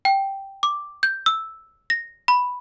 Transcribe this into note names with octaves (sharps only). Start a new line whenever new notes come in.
G5
D6
G6
E6
A#6
B5